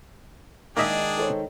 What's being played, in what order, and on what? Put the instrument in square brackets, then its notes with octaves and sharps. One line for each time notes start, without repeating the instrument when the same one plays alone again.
[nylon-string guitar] D#3 G#3 D#4 [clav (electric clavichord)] A#3 D#5 E5 [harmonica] D4 G#4
[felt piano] A4 C5 C#5